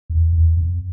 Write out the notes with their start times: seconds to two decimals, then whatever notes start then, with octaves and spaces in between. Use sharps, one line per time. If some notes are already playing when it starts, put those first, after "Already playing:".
0.10 E2
0.33 E2
0.57 F2